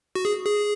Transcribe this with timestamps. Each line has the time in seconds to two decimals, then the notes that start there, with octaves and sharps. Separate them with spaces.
0.15 F#4
0.25 G#4
0.46 G#4